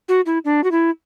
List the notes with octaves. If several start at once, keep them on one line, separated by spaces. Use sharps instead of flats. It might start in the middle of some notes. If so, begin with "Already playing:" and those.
F#4
E4
D4
F#4
E4